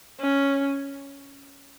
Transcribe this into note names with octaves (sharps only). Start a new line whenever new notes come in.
C#4